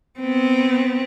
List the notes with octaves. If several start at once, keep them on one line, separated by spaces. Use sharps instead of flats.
B3 C4